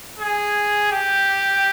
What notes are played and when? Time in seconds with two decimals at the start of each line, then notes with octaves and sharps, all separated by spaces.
0.19 G#4
0.92 G4